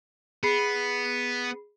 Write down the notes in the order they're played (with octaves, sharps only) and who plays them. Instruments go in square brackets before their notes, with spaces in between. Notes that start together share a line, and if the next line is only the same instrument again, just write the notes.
[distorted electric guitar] B3 [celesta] G#4 B5 C7